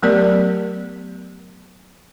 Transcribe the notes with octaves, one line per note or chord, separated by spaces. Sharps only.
F#3 A3 B3 G4 A#4 D5